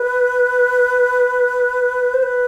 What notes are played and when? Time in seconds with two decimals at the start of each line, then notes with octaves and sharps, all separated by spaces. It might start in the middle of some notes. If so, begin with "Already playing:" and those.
Already playing: B4
2.14 C5
2.23 B4